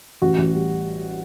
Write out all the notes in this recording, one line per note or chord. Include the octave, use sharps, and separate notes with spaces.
A1 F#4
A1
G3